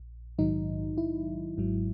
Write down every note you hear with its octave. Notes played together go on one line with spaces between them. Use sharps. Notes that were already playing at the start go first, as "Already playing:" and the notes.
Already playing: A#1
A#1 G#2 D#3 F#3 D#4
E4
G#1 G#2 F#3